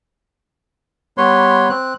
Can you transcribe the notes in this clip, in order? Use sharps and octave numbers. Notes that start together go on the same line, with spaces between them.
G3 B3 B4 C#5 C6
C4 F#6